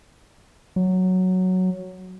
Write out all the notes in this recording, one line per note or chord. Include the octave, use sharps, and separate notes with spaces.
F#3